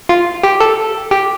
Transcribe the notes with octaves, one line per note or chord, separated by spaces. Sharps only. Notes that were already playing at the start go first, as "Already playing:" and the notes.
F4
G4
A4
G4